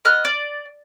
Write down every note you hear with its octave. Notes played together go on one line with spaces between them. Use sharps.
B3 D#5 F6 F#6
D5